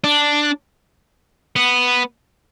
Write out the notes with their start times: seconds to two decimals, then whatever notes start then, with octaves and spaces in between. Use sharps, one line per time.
0.04 D4
1.56 B3